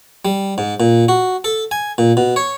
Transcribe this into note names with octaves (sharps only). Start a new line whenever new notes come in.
G3
G#2
A#2
F#4
A4
G#5
A#2
B2
C#5